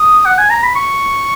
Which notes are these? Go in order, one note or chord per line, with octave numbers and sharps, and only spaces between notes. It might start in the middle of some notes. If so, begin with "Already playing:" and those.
Already playing: D#6
F#5
G#5
A#5
B5
C#6